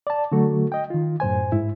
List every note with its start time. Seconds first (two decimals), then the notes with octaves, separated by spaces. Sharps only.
0.07 D5 A5
0.32 D3 F#3 A3 F#4 A4
0.72 D#5 G5
0.90 D#3 F4
1.20 F#2 A2 C5 G#5
1.52 G#2 E4